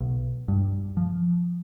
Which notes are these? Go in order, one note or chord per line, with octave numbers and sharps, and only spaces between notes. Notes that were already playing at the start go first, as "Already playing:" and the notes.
B1
G2
F3